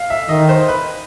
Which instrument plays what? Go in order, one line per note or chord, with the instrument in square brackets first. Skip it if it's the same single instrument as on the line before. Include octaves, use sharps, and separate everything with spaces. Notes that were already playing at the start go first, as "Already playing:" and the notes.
Already playing: [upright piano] F5
E5
[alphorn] D#3 [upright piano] D#5
[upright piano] C5
B4